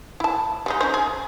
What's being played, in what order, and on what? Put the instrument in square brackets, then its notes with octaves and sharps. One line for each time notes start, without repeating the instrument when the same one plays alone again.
[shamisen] E4 A5
G3 G#3 D#4
C#4 D#4 C5
G#4